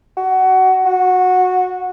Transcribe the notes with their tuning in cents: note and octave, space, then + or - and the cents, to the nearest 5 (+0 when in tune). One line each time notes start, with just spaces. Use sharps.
F#4 +20
F#4 -15